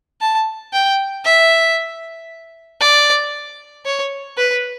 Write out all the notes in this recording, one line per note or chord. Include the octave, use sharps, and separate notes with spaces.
A5
G5
E5
D5
C#5
B4